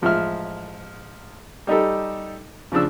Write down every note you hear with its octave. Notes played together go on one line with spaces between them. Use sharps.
A1 F3 G#3 E5 F6
G3 D#4 G4 A4
C#3 F3 D4 E6